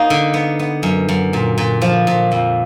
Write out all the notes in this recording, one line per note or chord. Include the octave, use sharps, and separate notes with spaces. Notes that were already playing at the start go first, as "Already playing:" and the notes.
Already playing: A#3 D#4
D3
B3
B3
F#2
F#2
A#2
A#2
F3
A#2
F2